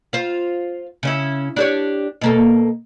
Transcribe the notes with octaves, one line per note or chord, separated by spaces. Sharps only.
F4 C5
C#3 C#4 E4
D4 G4 C#5
B2 A#3 A4